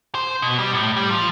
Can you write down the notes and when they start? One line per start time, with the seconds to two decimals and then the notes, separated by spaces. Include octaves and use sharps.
0.15 C5
0.42 B2
0.58 G3
0.73 A2
0.97 G3
1.10 F3